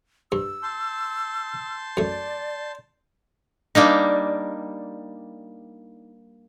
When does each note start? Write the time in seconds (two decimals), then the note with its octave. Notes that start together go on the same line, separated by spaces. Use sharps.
0.32 G2 E6
0.63 A5 C6 G6
1.97 F#2 A3 D5
3.75 G3 A#3 D4 D#4